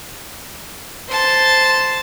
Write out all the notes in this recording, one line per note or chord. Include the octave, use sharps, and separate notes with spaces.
C5 A5